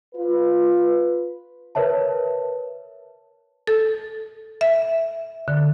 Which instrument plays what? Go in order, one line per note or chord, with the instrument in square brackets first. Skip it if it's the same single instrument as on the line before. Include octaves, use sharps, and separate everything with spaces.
[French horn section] F4 B4
[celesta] A#4 B4 C#5 E5 A5
[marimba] A4
E5
D3